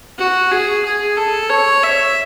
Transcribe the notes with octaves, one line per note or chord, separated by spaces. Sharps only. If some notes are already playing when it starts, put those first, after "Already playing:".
F#4
G#4
G#4
A4
C#5
E5